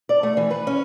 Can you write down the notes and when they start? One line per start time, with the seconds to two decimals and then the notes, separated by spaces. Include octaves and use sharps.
0.09 D5
0.23 A3
0.37 E3
0.51 B4
0.67 C#4